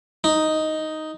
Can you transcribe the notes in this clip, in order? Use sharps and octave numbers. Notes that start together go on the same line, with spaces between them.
D#4